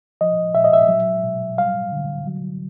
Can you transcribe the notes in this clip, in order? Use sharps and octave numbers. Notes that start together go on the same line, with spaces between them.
F3 D#5
A#2 E5
D#5
E5
F#3
B2
G3 F5
D3
F#3